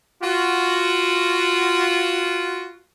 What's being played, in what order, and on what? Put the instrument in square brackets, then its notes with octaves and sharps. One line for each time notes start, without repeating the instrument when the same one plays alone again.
[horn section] F4 F#4